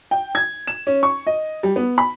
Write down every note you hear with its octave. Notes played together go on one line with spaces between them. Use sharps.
G5
G#6
E7
C#4
C#6
D#5
G3
B3
B5